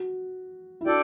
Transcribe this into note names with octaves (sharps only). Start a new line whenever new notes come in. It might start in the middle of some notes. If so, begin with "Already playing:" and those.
Already playing: F#4
E4
D4 F#4 A4 D5 G5